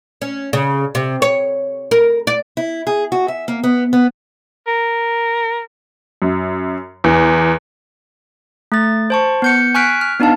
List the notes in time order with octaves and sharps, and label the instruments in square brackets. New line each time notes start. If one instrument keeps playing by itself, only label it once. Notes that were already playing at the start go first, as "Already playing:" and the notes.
[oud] C#4
C#3
C3
C#5
A#4
D5
[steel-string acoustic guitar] E4
G#4
F#4
E5
A#3
B3
B3
[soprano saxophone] A#4
[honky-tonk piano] F#2
E2
[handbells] A3 A6
C5 A5 C#6
B3 G6 C#7
G#5 C#6 F6 F#6 B6 D7
F6
B3 D4 D#4 F5 A5